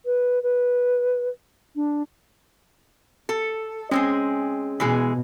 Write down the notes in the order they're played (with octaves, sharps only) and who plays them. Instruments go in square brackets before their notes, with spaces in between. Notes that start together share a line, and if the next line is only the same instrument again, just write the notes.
[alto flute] B4
B4
D4
[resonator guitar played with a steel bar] A4
[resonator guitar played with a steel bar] G#3 C4 G#4 [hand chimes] C#4
[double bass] B2 [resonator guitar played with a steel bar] E3 G#3 G#4